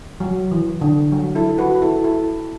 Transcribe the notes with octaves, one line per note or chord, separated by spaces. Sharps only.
F#3
E3
D3
F#3
E4 A4
F#4 B4
E4 A4
E4 A4